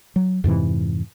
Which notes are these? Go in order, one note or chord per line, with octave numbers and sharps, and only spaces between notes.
F#3
F2 G#2 C3 E3